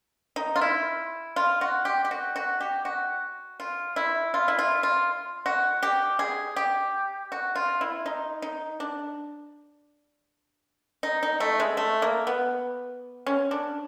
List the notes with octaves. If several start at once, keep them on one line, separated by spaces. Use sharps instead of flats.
D#4
F4
E4
F4
F#4
G4
G4
F#4
F#4
G4
F#4
F4
E4
F4
E4
F4
F4
F#4
G4
G#4
G4
F#4
F4
E4
D#4
D#4
D4
D#4
D#4
A3
G#3
A3
A#3
B3
C#4
D4